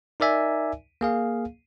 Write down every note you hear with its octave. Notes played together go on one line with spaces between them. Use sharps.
D#4 A#4 D5 E5 G#5
A#3 G#4 F5